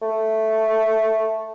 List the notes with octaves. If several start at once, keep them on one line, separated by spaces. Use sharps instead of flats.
A3